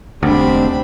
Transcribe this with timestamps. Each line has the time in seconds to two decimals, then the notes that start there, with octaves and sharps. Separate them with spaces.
0.23 E1 D2 G3 G#3 C4 D4 B5